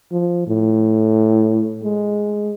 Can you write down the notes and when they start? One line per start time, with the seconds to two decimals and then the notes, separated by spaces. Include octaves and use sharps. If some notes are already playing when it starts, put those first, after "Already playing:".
0.11 F3
0.47 A2
1.83 G#3